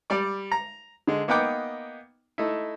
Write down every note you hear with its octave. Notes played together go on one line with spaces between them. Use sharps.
G3 D5 D6
A#5
D3 G#3
A#3 B3 D#4 F#5 G5 D6
A3 D#4 E4